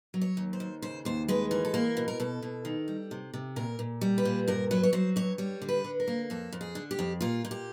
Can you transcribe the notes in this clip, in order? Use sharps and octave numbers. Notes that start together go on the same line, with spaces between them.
F#3
C#5
D#2
C5
D#2
C#3 C5
D#2 C5
G#3 B4
E3 A#4
A4
A#3 A#4
B2
A#4
B2 A4
B2
D#3
G3
C3
C3
A#2 A#4
A#2
G3
B4
A#2
G2 A#4
F#3 B4
C#5
F#3 C5
G2 C#5
G3 C#5
D3
B4
D3
A#4
A#3
F2 A4
F2
G#4
D3
G4
F2
A#2 F4
A#2
G4